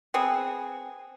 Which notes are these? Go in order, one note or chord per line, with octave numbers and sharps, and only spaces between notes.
B3 C4 G#4